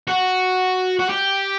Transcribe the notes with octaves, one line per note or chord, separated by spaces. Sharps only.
F#4
F#4
G4